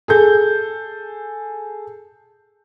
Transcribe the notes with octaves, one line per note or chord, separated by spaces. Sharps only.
G#4 A4 G6